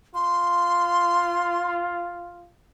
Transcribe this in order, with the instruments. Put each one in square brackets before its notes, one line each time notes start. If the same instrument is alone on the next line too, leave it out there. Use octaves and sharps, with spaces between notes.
[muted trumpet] F4 [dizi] C6